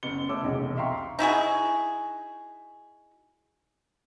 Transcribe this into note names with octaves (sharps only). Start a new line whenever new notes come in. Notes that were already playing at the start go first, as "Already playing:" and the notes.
F#1 B3 C#7 G7
F#1 A3 C#4 D6 E6
F1 B1 E2
E5 F5 G5 A#5 C6 C#6
D#4 E4 F#4 G#4